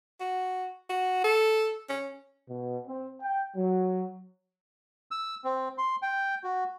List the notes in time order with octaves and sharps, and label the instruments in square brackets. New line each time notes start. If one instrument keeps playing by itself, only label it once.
[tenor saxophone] F#4
F#4
A4
C#4
[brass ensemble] B2
C4
G5
F#3
[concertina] E6
C4
C6
G5
F#4